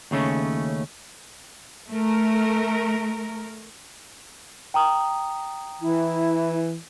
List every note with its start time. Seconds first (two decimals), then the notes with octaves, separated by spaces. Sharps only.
0.11 D#2 C#3 A3 C#4
1.92 A3 A#4
4.74 G5 A#5 D#6
5.82 E3 E4